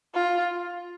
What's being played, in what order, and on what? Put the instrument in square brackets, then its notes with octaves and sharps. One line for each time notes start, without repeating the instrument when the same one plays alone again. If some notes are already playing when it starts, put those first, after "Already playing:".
[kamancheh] F4